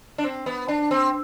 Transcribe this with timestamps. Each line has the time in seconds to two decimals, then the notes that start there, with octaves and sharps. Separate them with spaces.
0.18 D4
0.24 C4
0.46 B3
0.68 D4
0.91 C4